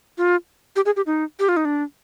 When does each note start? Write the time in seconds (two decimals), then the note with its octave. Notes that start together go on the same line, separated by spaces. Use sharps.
0.18 F4
0.76 G4
0.86 G#4
0.97 G4
1.06 D#4
1.40 G4
1.49 F4
1.57 D#4
1.65 D4